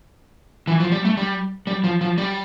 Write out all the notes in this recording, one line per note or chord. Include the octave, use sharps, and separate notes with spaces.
E3
F3
G3
A3
G3
G3
F3
F3
G3